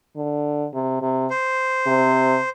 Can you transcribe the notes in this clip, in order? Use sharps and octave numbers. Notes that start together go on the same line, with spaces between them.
D3
C3
C3
C5
C3